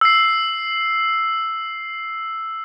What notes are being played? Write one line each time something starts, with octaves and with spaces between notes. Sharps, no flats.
E6 C7